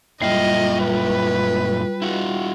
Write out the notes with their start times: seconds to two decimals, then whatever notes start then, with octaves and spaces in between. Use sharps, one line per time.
0.22 F#2 A#2 G3 E4 F4 D#5
0.84 B4
2.02 E4 F#4